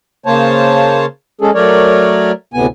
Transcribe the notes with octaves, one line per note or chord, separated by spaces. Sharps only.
C#3 A#3 C5 C#5 A5
G#3 C#4 G#4 A4
F#3 A3 A#4 C#5 D5
D2 A2 C3 B3 G#5